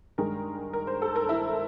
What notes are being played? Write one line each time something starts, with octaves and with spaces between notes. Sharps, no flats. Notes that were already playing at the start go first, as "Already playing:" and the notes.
G2 D#3 G#3 A#4
A#4
C5
A4
A#4
E4